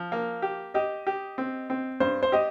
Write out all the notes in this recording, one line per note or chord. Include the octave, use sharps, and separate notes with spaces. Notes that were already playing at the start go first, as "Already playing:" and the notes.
Already playing: F3
A#3
G4
G4 D#5
G4
C4
C4
G2 C5
C5
G4 D#5